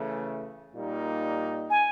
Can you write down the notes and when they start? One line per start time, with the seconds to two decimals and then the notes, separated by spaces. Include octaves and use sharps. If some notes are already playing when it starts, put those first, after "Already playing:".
Already playing: C#3 E3 A3
0.74 A#2 G3 A#3 D#4
1.70 G#5